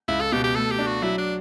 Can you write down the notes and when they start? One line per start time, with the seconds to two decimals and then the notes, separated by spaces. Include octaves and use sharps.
0.08 C#2 E4
0.21 A4
0.32 B2 G4
0.44 G4
0.56 A3 A4
0.71 G4
0.79 D4
0.87 F#4
1.02 F#3 E4
1.18 D4